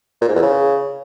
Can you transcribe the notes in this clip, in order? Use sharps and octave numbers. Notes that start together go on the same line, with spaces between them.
A#2
G#2
E2
C#3